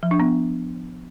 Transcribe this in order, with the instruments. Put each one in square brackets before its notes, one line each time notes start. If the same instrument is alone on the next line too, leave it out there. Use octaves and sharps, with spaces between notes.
[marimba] F3
D4
B3